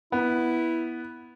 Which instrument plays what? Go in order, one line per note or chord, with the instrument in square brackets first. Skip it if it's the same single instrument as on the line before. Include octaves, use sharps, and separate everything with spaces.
[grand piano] B3 [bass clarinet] E4